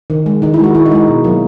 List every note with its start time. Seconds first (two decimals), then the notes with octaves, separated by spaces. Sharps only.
0.10 D#3
0.26 G#3
0.42 D#3 D#4
0.54 E4
0.59 G#3 F#4
0.75 D#3 E4
0.86 D#4
0.91 G#3 E4
1.08 B2
1.24 F#3 A#3